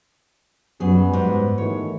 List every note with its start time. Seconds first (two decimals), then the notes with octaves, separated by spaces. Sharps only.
0.80 F#2 G3 B3 F#4 G#4
1.13 G#2
1.58 D#3 E3 A3 C#5